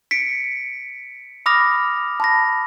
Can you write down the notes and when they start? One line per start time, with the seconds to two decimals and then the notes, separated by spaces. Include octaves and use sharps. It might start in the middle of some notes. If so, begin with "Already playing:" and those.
0.11 B6 C#7 D7
1.46 B5 D6 D#6 F6 A#6 F7
2.20 A5 B5 A#6